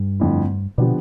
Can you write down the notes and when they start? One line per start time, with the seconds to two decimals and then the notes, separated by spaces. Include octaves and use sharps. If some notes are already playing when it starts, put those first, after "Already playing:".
Already playing: G2
0.20 F2 D3 A3 E4
0.78 B2 D3 F3 B3 D4 G4